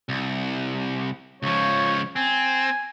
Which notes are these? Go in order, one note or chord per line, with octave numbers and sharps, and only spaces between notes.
C2
C#2 F3 C#5
C4 G#5